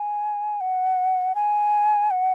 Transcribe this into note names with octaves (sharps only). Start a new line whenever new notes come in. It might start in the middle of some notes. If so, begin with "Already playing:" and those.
Already playing: G#5
F#5
G#5
F#5